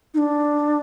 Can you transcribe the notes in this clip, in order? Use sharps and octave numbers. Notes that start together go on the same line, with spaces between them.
D#4
D4